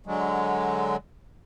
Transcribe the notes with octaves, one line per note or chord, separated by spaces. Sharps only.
D3 F#3 G#3